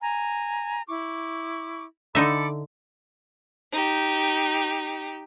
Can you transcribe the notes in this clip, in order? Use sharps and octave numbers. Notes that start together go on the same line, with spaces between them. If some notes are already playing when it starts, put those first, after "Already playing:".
G#5 A#5
E4 C#6 D6
D3 D#4 A4 E5 B5 D6
D#4 G4